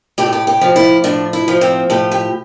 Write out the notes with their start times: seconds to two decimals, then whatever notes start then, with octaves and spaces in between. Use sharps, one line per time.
0.18 A2 G4
0.26 A4
0.33 G4
0.47 G4
0.61 F3
0.76 E4
1.04 A2 D4
1.33 E4
1.48 F3
1.61 C4
1.90 A2 G4
2.12 G4